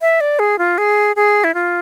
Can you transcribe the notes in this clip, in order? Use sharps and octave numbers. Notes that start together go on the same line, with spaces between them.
E5
D5
G#4
F4
G#4
G#4
E4
F4